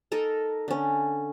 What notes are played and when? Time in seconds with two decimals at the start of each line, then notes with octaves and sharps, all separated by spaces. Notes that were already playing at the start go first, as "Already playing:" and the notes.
0.12 D#4 A4 A#4 D#5
0.68 D3 C#4